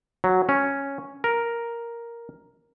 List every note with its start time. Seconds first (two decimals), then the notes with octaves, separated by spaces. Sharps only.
0.24 F#3
0.49 C#4
1.24 A#4